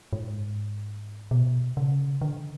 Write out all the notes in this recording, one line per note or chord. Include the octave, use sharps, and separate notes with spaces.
G#2
B2
C#3
D3